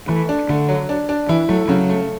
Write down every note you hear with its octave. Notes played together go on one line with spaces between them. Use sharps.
E3 A3
D4
D3 A3
F#3
D4
D4
E3 E4
F#3 A3
C#3 F#3
A3